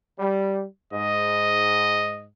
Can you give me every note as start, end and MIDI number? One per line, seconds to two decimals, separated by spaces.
0.19 0.65 55
0.93 2.28 44
0.93 2.25 75